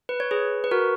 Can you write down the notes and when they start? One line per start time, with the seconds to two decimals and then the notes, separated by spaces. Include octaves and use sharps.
0.09 B4
0.20 C#5
0.31 G#4 B4
0.64 B4
0.71 F#4 A#4